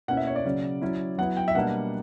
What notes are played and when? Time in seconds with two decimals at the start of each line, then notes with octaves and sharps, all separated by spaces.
0.08 B2 A#3 C#4 E4 F#5
0.17 E5
0.27 C#5
0.36 D5
0.45 C#3 F#3 C#4
0.81 F#3 C#4 E4
1.18 F#3 B3 E4 F#5
1.37 G5
1.48 E5
1.55 B2 G3 A#3 D4 F#5